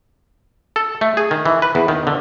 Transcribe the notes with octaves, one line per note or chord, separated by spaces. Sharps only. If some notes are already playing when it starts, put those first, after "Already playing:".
A4
A3
G#4
D#3
E3
B4
E2
D#3
D3